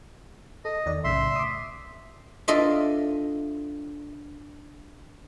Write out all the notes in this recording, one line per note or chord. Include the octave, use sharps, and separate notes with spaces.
A4 D#5
E2 D#3 D5
B1 A2 C#3 E5 C6
D6 D#6
D4 F4 A4 D#5 E5